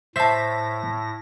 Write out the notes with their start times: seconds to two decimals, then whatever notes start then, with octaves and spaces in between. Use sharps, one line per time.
0.16 A2 C5 E5 A5 A#6 B6